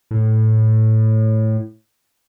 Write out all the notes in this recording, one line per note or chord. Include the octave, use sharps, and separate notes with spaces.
A2